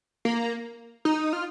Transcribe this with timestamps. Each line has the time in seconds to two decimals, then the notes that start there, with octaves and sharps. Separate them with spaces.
0.25 A#3
1.05 D#4
1.33 F4